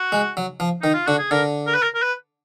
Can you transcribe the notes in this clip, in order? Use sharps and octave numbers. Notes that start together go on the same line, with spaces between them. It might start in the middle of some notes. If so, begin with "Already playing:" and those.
Already playing: F#4
G#3
F#3
F3
D#3 D#4
F4
D3 F#4
G#4
D3 A#4
A#4
B4
A#4
A#4
B4